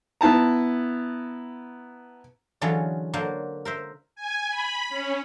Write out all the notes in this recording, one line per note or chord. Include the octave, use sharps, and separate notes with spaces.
B3 E4 A5 A#5
D3 E3 F#3 C#4 F4 G#4
D3 F#3 A#3 C5
A#4 C5 E5
G#5
B5
C#4